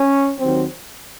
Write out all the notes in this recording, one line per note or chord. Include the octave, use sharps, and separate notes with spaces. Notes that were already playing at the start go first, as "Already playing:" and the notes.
Already playing: C#4
D#2 D#3 F#3 C4